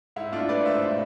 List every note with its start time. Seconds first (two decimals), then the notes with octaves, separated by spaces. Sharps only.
0.16 G#2 E4
0.32 A3 D4 F4
0.49 A3 B4 D5
0.65 G#2 C5 E5
0.82 B2